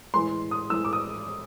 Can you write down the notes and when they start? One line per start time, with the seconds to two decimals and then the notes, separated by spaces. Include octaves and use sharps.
0.14 A2 E3 G#3 C6
0.51 D#6
0.70 A2 E3 G#3 E6
0.85 D6
0.93 D#6